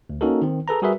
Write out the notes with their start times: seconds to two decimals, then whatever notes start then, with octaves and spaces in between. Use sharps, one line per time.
0.10 D2
0.21 A#3 C#4 D#4 F#4 A4 A#4
0.42 D#3 C4
0.68 G#4 A4 B4 A#5
0.82 G3 F#4 G#4 A#4 B4 E5